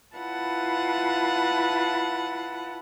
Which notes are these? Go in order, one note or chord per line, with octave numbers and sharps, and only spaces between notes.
E4 F4 B4 F#5 A5